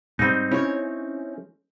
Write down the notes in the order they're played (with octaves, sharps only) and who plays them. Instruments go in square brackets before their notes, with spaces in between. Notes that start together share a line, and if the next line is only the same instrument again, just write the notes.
[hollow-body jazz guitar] G#2 G3 [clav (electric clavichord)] C4 D#4
[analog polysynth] C#4 [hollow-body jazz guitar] E4 C#5